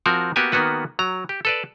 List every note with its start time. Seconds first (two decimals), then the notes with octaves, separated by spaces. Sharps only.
0.06 F3 C4 F#4 A#4
0.36 A#3 B3 F#4 G4 G#5
0.52 D#3 A#3 B3 F#4 B4
0.99 F#3 A#5
1.29 G4
1.45 A4 B4 D5